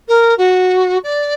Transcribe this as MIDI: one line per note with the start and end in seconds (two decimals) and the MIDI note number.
0.08 0.34 70
0.38 0.98 66
1.03 1.34 74